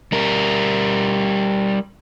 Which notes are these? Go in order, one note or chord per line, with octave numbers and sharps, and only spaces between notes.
G3 A#4